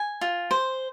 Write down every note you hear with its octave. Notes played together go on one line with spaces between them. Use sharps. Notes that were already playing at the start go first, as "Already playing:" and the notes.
Already playing: G#5
F4
C5